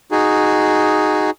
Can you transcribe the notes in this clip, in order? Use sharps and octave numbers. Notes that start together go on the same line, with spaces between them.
D#4 F#4 G#4